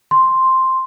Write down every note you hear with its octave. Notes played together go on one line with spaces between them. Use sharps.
C6